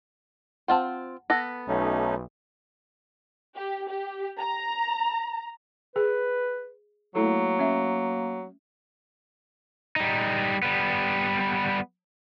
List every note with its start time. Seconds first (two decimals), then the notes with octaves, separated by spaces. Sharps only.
0.68 C4 F4 C5 F#5 A5
1.30 B3 A4 F#5 A#6
1.68 B1 A3 C#4 D#4
3.56 G4
3.89 G4
4.39 A#5
5.96 G#4 B4
7.15 F#3 A3 A#3 E4 A4
7.59 C#4 E5
9.96 G3 D#4
10.63 G3 B3